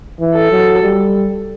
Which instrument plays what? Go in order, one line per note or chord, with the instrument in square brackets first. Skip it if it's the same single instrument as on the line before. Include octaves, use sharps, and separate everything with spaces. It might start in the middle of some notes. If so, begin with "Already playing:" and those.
[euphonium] E3
[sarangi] A4
[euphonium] F#3
G3